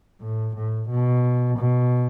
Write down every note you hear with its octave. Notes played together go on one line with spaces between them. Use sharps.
A2
A2
B2
B2